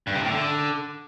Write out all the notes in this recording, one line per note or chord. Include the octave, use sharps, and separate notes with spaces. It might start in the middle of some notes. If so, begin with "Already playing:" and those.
G2
C3
A2
D3